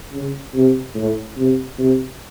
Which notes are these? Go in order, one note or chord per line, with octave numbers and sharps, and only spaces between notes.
C#3
C3
A2
C3
C3